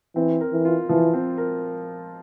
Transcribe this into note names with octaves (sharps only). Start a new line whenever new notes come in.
E3 C4
A#4
E3
F4
E3 F3
C4
A#4